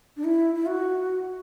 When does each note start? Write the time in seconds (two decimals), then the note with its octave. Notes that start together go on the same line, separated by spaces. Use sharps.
0.17 D4
0.24 E4
0.55 E4
0.66 F#4